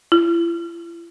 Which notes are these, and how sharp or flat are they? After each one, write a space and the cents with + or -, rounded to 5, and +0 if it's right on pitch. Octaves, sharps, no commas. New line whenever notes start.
E4 +45